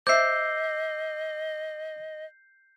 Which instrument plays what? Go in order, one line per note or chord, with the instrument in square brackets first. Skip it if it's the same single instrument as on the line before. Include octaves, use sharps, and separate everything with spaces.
[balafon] C5 E5 [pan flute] D#5 [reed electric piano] D6 E6 [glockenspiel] G6 C7